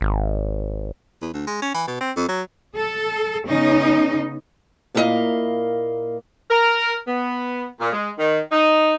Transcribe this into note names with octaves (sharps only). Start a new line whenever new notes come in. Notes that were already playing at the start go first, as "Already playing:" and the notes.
G#1
E2
D2
G#3
C#4
E3
B2
C4
F2
F#3
A4
C#3 B3 C#4 D#4
A#2 A#3 E4 F4 D#5 F5
A#4
B3
A#2
G#3
D#3
D#4